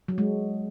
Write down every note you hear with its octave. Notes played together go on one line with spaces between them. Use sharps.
F#3
G#3